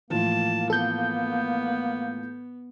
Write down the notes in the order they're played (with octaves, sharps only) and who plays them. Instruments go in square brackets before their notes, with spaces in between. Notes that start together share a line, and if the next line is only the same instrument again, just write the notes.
[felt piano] A2 E3 F3 [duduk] A#3 [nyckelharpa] A5
[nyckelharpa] B3 [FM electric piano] A4 G6